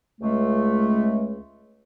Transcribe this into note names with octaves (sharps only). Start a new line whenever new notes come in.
C#2 G#3 A3